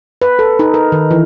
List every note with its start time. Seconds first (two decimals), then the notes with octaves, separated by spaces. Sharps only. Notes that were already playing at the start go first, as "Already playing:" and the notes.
0.22 B4
0.39 A4
0.59 D#4
0.74 A#4
0.92 D#3
1.11 E3